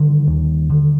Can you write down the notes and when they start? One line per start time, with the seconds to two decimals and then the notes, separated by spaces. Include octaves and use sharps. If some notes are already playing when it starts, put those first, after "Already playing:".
Already playing: D3 D#3 G3
0.27 D#2
0.70 D3